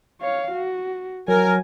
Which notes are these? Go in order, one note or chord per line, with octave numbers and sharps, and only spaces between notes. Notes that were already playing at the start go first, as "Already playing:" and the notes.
C#5 F5
F#4
F#3 A#4 G#5